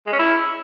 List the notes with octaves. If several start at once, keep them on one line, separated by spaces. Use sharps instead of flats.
G#3
C#4
E4